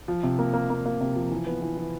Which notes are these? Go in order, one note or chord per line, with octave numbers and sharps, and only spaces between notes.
F3
C3
A#3
A#3
A#3
A#3
C3
F3
E3
B3
E3
E3